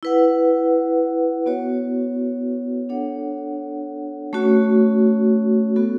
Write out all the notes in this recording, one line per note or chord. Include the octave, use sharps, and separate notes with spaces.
E4 B4 F#5
B3 F#4 C#5
D4 A4 C#5 F#5
A3 C#4 F#4 C#5
B3 F#4 A4